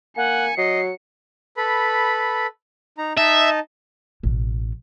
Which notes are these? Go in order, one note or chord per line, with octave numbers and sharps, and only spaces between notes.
A#3 F#5 G#5 C#7
F#3 D#5 C7
A4 B4 B5
D#4 A#5
D#4 D#5 E5 A5
A1 B2